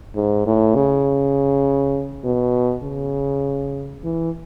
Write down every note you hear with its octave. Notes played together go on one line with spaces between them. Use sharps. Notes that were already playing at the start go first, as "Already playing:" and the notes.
G#2
A2
C#3
B2
C#3
E3